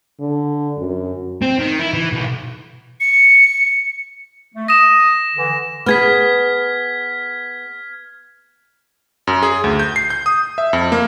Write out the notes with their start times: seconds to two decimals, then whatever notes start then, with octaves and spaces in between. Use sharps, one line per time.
0.20 D3
0.78 F#2
1.42 C4
1.59 D#3
1.79 E4
1.94 E3
2.12 B1
3.00 C#7
4.55 A3
4.68 D#6 A#6 E7
5.36 D3 E3
5.86 B3 G#4 F6 G#6 B6
9.27 F#2
9.43 G#4
9.64 D2
9.79 G6
9.96 C7
10.10 G6
10.26 D#6
10.58 E5
10.73 F2
10.92 A#3